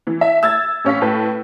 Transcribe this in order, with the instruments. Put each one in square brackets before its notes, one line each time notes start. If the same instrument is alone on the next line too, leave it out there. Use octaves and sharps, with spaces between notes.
[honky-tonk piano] E3
E5
E6 G#6 A6
A1 C#4 F5 B6
A2 B4